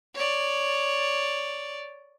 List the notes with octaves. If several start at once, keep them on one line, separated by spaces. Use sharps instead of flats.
C#5 D5